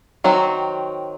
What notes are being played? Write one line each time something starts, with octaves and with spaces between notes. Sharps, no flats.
D#3 F#3 C4 F#4